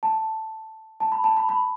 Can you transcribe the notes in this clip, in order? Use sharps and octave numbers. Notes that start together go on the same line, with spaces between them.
A5
A5
B5
A5
B5
B5